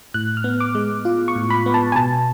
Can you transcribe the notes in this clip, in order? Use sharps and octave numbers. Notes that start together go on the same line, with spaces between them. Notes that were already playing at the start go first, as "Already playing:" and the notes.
A2 F#6
F6
B3
D6
G#3
F4
C#6
A2
B5
B3
A5
G#5
B2 A5